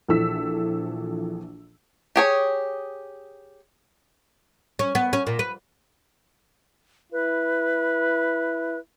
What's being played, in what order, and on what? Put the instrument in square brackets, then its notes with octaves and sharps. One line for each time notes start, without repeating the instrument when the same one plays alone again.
[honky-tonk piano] A#1 E3 F3 A4 E6 B6
[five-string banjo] G4 G#4 C#5
[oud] C#4
B3
C#4
A#2
B4
[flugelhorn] E4 [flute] B4